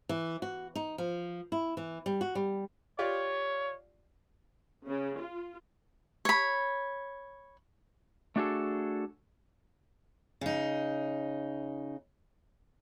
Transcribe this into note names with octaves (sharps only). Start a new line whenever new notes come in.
E3
F#4
D#4
F3
E4
E3
G3
F#4
G3
F4 G4 C#5 D5
C#3
F4
C#5 B5
A3 D4 F#4 G#4 A4
C#3 D#4